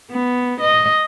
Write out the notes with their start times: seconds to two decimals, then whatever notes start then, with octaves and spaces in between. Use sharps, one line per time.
0.10 B3
0.61 D#5